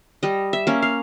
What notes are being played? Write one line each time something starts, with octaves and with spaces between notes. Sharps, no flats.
G3 D#5
E5
A#3 C#4
F5